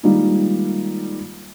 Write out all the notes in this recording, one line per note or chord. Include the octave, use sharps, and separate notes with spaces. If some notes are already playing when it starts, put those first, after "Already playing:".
D#3 G3 G#3 A#3 D#4 F4